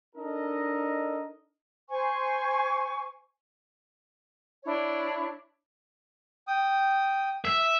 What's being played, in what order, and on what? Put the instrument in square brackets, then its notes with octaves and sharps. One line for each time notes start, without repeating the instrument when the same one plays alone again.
[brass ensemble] D4 D#4 A4 A#4 D#5
[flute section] C5 G#5 C#6
D4 E4 C#5
[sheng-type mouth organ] G5 D#6
[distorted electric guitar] E5